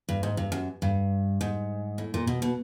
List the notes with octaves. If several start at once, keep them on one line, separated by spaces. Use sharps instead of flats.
G2
G#2
G2
F#2
G2
G#2
A2
A#2
B2
B2